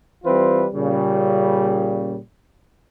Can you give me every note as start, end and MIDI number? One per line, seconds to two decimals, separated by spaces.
0.25 0.67 52
0.25 0.67 55
0.25 0.67 60
0.25 0.67 65
0.25 0.67 71
0.25 0.67 72
0.74 2.17 46
0.74 2.17 49
0.74 2.17 55